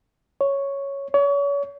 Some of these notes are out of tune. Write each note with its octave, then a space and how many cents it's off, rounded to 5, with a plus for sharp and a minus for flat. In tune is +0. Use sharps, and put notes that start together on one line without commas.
C#5 +0
C#5 +35